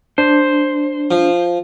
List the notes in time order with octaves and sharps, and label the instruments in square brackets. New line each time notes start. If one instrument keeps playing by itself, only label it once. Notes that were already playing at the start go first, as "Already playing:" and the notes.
[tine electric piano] D4 [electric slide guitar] C5
[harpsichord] F3